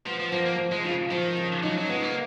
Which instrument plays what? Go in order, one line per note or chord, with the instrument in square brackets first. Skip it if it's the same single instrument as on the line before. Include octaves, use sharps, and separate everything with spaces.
[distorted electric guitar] F3 [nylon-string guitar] B3
[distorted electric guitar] F3
[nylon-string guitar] F3 [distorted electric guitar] A#3
[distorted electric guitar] A#3
[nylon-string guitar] F3
[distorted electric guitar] G#3
[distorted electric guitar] C#3 [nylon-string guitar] F4
[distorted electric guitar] D#3 [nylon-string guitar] F3
[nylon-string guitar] C#3
[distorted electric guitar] F#3 [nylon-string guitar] D#4
[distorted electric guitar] F#3
[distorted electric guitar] G#3 [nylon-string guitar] B3
[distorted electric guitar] A#3